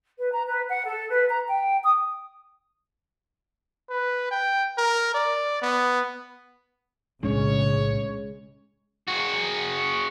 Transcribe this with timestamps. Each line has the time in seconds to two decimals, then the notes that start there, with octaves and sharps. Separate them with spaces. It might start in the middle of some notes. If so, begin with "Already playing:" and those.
0.18 B4
0.32 A#5
0.46 B4
0.69 F#5
0.86 A4
1.10 B4
1.29 A#5
1.48 G5
1.83 D#6
3.90 B4
4.31 G5
4.78 A#4
5.14 D5
5.62 B3
7.23 B1 A2 C#3 G#3 C#4 D4 C#5
9.08 F#4 G#4